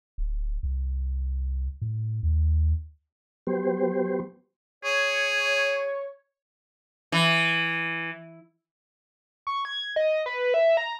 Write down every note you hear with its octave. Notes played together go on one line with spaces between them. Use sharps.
D1
C2
A2
D#2
F#3 B3 G4 C5
G#4 C#5
E3
C#6
G#6
D#5
B4
E5
A#5